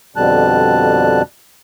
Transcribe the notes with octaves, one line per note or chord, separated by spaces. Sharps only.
F2 B2 D3 G3 A5 F#6